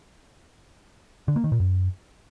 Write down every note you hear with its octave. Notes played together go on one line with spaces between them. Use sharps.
D3
A#3
D#3
A#2
F#2